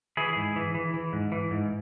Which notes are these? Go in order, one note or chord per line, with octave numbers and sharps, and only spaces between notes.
E3 E4 G#4
G#2
E3
E3
E3
G#2
E3
G#2